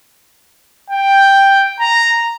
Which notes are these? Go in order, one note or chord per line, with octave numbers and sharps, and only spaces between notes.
G5
A#5